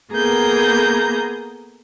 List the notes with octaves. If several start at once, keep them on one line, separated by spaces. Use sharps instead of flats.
A#3 B3 G#4 A4 A#5 G6